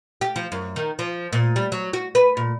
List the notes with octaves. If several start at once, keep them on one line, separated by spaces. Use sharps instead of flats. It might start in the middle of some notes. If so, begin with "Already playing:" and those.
G4
F3
F#2
D#3
F3
A#2
G3
F#3
F#4
B4
A#2